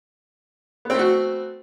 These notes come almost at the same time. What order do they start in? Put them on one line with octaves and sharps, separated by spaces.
B3 C4 A3 F#4